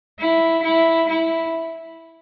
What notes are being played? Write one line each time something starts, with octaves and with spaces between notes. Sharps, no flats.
E4
E4
E4